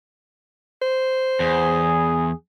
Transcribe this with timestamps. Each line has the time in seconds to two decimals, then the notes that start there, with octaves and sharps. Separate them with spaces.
0.82 C5
1.40 E2 G#4